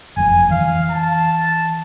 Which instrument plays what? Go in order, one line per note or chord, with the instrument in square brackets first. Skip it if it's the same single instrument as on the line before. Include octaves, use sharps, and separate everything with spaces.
[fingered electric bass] F#1 F2 [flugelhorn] G#5
[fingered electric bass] E3 [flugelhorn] F5
[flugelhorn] A5